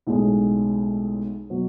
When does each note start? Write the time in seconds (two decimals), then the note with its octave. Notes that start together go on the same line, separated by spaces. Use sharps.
0.07 B1 A2 G#3
1.50 B2 F#3